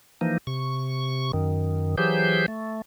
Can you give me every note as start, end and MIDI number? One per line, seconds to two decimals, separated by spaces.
0.21 0.38 52
0.21 0.38 53
0.21 0.38 58
0.21 0.38 63
0.47 1.32 48
0.47 1.32 85
1.33 1.96 42
1.33 1.96 51
1.97 2.46 52
1.97 2.46 54
1.97 2.46 67
1.97 2.46 68
1.97 2.46 72
1.97 2.46 91
2.48 2.82 57